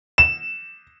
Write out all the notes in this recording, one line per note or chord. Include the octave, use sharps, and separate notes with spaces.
E7